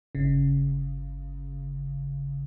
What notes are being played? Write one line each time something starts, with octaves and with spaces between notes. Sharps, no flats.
G1 C#3